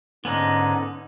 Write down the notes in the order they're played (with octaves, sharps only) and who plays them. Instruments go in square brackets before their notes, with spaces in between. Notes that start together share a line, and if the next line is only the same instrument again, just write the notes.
[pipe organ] G#2 D3 G#5 [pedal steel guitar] B3 C#4 D#4